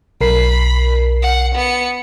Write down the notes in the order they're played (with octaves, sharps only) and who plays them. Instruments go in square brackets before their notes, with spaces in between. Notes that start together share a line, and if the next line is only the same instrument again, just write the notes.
[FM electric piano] B1 A#4 C7 [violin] B5
[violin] F#5
B3 C#7